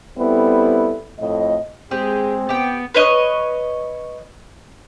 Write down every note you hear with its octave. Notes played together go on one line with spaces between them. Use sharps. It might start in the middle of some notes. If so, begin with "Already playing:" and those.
G3 B3 C4 E4 A4
F2 A2 D#5
G#3 C4 G4 G#4
B3 G4 G5
B4 C#5 D#5